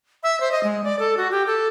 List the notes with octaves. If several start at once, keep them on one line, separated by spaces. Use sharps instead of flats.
E5
C5
D#5
G#3
D5
A4
F#4
G4
A4